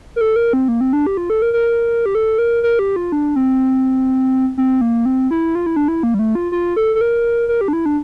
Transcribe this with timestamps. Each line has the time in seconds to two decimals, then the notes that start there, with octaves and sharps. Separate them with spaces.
0.16 A#4
0.21 A4
0.36 A#4
0.53 C4
0.68 A#3
0.81 C4
0.93 D4
1.06 G4
1.17 F4
1.30 A4
1.42 A#4
1.53 A#4
2.06 G4
2.15 A4
2.38 A#4
2.63 A#4
2.79 G4
2.96 F4
3.12 D4
3.36 C4
4.58 C4
4.81 A#3
5.05 C4
5.31 E4
5.55 F4
5.66 E4
5.76 D4
5.88 E4
6.03 A#3
6.14 G3
6.19 A3
6.35 F4
6.52 F4
6.76 A4
6.95 A4
7.01 A#4
7.49 A#4
7.61 G4
7.68 D4
7.73 E4
7.86 D4